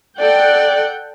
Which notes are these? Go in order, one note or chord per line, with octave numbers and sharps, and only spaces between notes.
A4 D5 F#5 G5